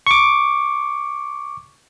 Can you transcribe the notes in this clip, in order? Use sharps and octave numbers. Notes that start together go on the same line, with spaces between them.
C#6 D6